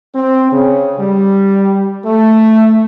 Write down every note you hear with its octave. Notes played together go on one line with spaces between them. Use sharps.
C4
C#3
G3
A3